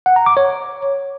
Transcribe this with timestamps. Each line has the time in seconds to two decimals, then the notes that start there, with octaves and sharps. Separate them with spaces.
0.06 F#5
0.16 A#5
0.26 D6
0.37 C#5